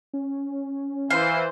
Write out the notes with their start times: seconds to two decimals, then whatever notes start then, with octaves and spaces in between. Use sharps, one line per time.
0.14 C#4
1.10 E3 C5 F5